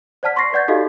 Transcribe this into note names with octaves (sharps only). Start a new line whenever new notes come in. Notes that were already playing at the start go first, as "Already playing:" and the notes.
C5 D5 F#5 A5 F6 B6
C6 C#6 A6 A#6 C7
B4 D5 F#5 G6 A6
D#4 F#4 G4 A4 D#5 F5